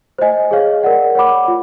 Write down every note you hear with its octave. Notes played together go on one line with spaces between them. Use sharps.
C5 D#5 G#5
G#4 C#5 F5
A#4 D5 F#5
C#5 F#5 B5 D6
F4